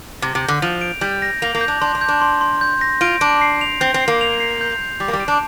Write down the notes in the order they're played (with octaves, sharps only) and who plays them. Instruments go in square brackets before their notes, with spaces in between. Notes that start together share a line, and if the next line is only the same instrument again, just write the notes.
[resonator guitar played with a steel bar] C3 [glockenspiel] A#6
[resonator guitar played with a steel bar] C3
[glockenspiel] G6
[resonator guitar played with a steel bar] D3
[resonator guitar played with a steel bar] F3 [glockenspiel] F7
[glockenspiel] D7
[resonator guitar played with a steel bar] G3 [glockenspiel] G6
[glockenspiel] A#6
[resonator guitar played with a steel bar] A#3 [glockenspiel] F7
[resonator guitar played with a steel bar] A#3
[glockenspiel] G6
[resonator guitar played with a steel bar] D4
[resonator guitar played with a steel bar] D4 [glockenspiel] C6
[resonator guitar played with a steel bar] D4
[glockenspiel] G6
[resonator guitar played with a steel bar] D4
[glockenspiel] C6
C6
G6
A#6
[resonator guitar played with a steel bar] F4 [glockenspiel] D7
[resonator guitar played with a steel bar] D4 [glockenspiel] D7
[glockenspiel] C7
F7
[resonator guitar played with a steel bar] C4 [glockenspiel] G6
[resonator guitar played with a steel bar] C4
[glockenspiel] C7
[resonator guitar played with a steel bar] A#3
[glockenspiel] F7
C7
G6
G6
[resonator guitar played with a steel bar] G3 [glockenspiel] D6
[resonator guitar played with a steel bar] A#3
G3
[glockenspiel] D7
[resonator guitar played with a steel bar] D4